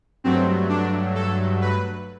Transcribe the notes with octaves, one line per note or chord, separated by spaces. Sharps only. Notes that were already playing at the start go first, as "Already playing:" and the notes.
G2 F#3 A3 C4
D4
A4
B4